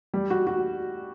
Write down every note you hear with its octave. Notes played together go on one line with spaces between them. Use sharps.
G3
F#4
F#4